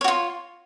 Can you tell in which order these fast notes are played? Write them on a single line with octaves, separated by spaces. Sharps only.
C#5 F#4 F4